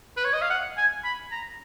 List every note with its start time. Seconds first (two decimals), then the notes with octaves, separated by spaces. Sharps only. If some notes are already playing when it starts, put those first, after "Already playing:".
0.17 B4
0.25 C#5
0.33 D#5
0.41 F5
0.50 F#5
0.77 G#5
1.04 B5
1.31 A#5